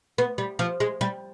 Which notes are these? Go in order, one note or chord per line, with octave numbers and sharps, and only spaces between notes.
B3
G3
F3
G#3
G3